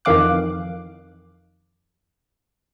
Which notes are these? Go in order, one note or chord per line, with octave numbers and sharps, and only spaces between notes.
F2 D#3 E3 F5 D6 F#6